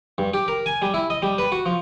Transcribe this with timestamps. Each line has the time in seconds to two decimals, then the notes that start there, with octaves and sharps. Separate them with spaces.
0.18 G2
0.34 G4
0.48 A#4
0.66 G#5
0.82 G3
0.94 E4
1.10 D#5
1.22 G3
1.38 B4
1.52 F#4
1.66 F3